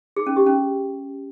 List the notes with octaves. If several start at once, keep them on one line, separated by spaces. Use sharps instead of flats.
G#4
C#4
G4
C#4